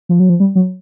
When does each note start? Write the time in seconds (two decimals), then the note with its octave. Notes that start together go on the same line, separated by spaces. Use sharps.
0.09 F3
0.20 F#3
0.30 F3
0.40 G3
0.55 F#3